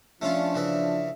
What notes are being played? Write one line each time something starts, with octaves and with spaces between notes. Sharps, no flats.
F3 A3 C#4 D4 F4
C#3 E3 E5